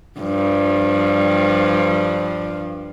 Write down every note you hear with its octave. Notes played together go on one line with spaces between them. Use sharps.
G2 F3